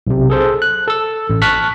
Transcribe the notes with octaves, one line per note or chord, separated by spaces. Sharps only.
B1 C3
G#4 A4 C5
F#6
A4 E6
A1
A5 C#6 F6 F#6 B6